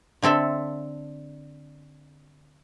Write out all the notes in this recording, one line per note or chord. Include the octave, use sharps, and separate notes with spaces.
D3 C4 A4 E5